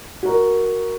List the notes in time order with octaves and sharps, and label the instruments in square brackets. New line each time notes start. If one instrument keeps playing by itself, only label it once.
[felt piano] F#4 A#4